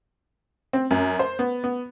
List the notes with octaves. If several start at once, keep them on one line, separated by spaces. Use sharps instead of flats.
C4
F#2
C5
B3
B3